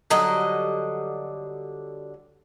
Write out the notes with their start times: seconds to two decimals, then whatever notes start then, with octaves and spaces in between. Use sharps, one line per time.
0.10 D3 F#3 G3 D#5